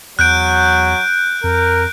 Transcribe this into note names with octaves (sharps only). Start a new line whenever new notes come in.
E2 F#3 F#6 G6 D7
F2 A#4